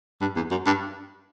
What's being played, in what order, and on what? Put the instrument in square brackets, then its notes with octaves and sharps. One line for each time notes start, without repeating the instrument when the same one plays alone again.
[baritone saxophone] G2
E2
F#2
G2